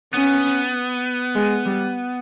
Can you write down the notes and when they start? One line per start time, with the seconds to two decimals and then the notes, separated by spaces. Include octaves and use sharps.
0.14 B3 C#4
1.35 G#3
1.66 G3